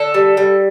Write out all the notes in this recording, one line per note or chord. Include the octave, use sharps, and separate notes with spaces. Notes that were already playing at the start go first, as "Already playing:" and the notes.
Already playing: D3 A4
G3
G3